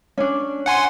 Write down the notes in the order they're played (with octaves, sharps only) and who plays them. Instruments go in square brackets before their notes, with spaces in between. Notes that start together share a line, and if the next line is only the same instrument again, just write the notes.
[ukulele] C#4 D4
[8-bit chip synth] F#5 G#5 C6